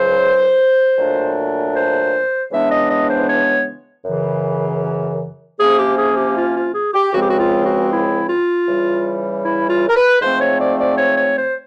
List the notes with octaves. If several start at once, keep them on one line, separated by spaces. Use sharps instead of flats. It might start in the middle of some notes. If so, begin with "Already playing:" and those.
Already playing: C#2 C#3 F#3 C5
A#2 F#3 A3 D4
C5
C#3 E3 G#3 B3 D4 E5
D#5
D#5
C5
C#5
F#2 C#3 E3
C3 F3 A#3 C#4 G#4
G4
G#4
G4
F4
F4
G#4
G4
C#2 C#3 F3 G#3 C4 F#4
G4
F#4
F4
F#4
E4
F4
C#3 E3 G3
E4
F4
A#4
B4
G#2 F3 A3 C4 C5
C#5
D5
D5
C#5
C#5
C5